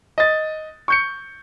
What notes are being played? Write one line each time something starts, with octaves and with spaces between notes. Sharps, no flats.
D#5 A6
C#6 G6 C#7